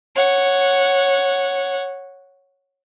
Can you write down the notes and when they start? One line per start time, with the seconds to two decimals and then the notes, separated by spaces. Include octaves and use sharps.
0.16 C#5 F#5